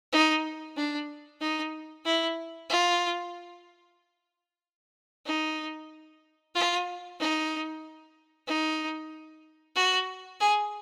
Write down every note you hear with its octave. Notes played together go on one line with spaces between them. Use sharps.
D#4
D4
D#4
E4
F4
D#4
F4
D#4
D#4
F#4
G#4